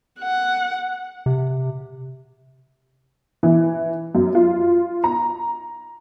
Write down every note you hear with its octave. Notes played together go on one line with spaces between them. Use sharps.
F#5
C3
E3
F#2
F4
A#5